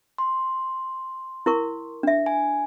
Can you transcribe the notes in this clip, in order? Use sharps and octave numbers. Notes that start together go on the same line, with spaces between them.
C6
E4 A#4 C#6
D4 E5
G#5